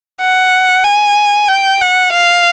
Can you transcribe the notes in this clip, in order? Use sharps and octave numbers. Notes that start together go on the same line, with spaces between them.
F#5
G#5
G5
F#5
F5